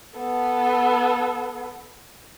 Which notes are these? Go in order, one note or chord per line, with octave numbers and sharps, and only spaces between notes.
B3 A4